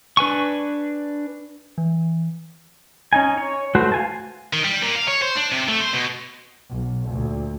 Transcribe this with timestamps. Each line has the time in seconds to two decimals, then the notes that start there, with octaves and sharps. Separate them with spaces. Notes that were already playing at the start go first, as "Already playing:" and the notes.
0.17 D4 B4 G#5 C#6
1.78 E3
3.13 C#4 D#4 G#5
3.37 C#5
3.75 A3 F#4 B4 C5
3.92 F5 G#5 A5
4.53 D#3
4.65 G3
4.83 A#2
4.96 F5
5.08 C#5
5.22 C5
5.37 D4
5.52 C3
5.68 A3
5.80 C5
5.93 B2
6.69 B1
7.10 D2 A#2